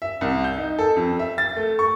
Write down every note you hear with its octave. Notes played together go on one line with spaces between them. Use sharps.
E5
C2
G6
D#4
A4
F2
E5
A6
A3
C#6